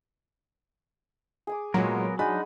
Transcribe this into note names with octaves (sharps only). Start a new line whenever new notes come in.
G#4 G#5 D6
A#2 F#3 G#3 B3 A#4
G#3 D4 D#4 F#5 G#5 B5